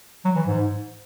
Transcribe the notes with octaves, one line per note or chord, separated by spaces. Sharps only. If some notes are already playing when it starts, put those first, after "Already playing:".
F#3
E3
G#2